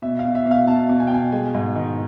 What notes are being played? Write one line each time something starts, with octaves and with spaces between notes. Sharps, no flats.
B2 E5
F5
B2
E5
B2 E5
F5
B2 A5
B2
G#5
G5
B2 G#5
G#3 G#5
G#2
D#3